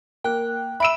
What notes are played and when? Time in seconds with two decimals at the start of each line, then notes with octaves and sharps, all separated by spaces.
0.24 A#3 G5 F#6
0.80 E5 B5 E6 D7 E7